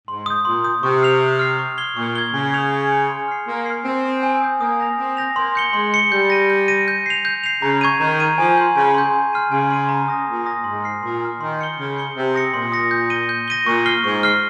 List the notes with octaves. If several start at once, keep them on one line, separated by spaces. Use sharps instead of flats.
G#2 C6
D#6 G6
A#2 C6
D#6 G6
C3 C#6
F6 C7 F7
C#6
F6 C7 F7
C#6
G#6 C7 G7
A#2 C#6
G#6 C7 G7
C#3 G#5
D#6 G6 C#7 F7
G#5
D#6 G6 C#7 F7
C6
F6 C7
A#3 C6
F6 C7
C4 G#5
D#6 G6
G#5
D#6 G6
A#3 D#6
G6 A#6 F7
C4 D#6
G6 A#6 F7
A#3 C6
G6 C#7 G7
G#3 C6
G6 C#7 G7
G3 G6
A#6 D#7
G6
A#6 D#7
G6
C7 F7
G6
C7 F7
C#3 A#5
C#6 G#6 D#7
D#3 A#5
C#6 G#6 D#7
F3 G#5
C6 G6
C#3 G#5
C6 G6
G#5
C6 F6 C7 D#7
C#3 G#5
C6 F6 C7 D#7
A#5
D#6 A#6
A#2 A#5
D#6 A#6
G#2 C6
F6 C7
A#2 C6
F6 C7
D#3 C6
G6 C#7 G7
C#3 C6
G6 C#7 G7
C3 C6
D#6 A#6 C#7
A#2 C6
D#6 A#6 C#7
G6
A#6 D#7 G7
G6
A#6 D#7 G7
A#2 C#6
F6 C7 G7
G#2 C#6
F6 C7 G7